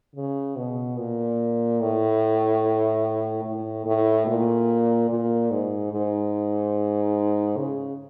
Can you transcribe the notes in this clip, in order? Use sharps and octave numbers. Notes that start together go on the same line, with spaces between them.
C#3
B2
A#2
A2
A2
A2
A#2
A#2
G#2
G#2
C#3